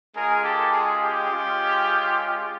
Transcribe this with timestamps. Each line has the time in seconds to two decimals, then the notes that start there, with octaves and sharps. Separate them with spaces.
0.15 G#3 C#4 F4 G#4 A#4
0.44 G4 A4
0.73 G#4
1.03 G4
1.31 G#3 C#4 F4